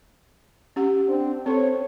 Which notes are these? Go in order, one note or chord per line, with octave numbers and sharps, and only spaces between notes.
C#4 G4 F#5
C4 D4
C4 A4 C5 C#5